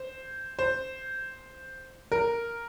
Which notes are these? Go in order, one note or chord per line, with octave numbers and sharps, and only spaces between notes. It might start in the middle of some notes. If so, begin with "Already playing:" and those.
Already playing: C5
C5
A#4